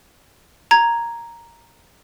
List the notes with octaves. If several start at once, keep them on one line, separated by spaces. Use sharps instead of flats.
A#5 G#6